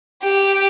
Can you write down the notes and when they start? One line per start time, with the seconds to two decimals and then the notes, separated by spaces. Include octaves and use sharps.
0.24 G4